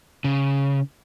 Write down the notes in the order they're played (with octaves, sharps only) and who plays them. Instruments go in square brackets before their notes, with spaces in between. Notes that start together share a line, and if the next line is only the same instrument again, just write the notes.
[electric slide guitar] C#3